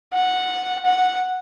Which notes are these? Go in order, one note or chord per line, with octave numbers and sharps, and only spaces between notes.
F#5
F#5